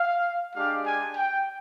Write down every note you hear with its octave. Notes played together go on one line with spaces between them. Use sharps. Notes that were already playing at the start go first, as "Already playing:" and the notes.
Already playing: F5
G#3 D4 G4 F5
G#5
G5